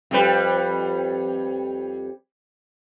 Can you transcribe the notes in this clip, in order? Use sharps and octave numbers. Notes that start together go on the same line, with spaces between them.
F2 G3 B4